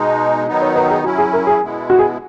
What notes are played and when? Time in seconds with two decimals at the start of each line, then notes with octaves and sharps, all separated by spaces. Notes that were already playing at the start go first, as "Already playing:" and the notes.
Already playing: B2 G#3 D#4
0.48 D#3 F#3 B3 D#4
0.62 C#5
0.75 B4
0.90 G#4
1.04 F#3 C#4 E4 F#4
1.18 G#4
1.33 A#4
1.47 G#4
1.61 B2 G#3 B3 E4
1.90 F#4
1.99 G#4